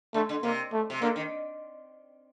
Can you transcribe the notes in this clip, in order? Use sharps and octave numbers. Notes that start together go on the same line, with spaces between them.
D3 A3
D3
C3 A#3
A3
C3
D3 A#3
D#3